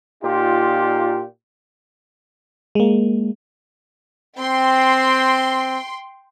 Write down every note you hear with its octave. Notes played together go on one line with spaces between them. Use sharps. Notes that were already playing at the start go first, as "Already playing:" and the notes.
A#2 D#4 F4 G4
G#3 A#3
C4 G5 C6